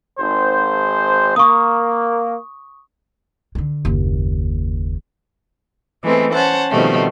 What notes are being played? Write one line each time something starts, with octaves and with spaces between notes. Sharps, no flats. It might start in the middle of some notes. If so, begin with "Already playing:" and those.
G#1 C5
A#3 C#6 D#6
D3 D#3
F#1 D#2
E3 G#3 A3 B3 C4
C#4 C5 F#5 A5
B2 D#3 F3 G3 A3 C4